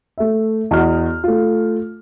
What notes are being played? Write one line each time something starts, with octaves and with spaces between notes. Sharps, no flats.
A3 E5
E2 F#4 D#5 F6
A3 F4